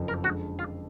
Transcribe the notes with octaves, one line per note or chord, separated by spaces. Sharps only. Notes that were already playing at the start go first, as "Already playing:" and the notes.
Already playing: F#1 F2 F3
A#4
F2 D3 G#3 F#4
F4